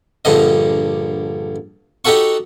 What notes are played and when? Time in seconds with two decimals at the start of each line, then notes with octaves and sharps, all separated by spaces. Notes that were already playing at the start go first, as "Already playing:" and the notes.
0.25 A#1 G2 D3 D#5
2.05 D#4 F#4 G4 A4 F#5 C#6